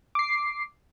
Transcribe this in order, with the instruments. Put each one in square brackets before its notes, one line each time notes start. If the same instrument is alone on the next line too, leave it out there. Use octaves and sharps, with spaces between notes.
[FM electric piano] D6 C7